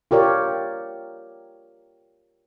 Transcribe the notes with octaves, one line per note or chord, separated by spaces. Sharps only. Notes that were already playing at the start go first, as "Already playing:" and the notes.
F4 G4 A#4 C#5 D5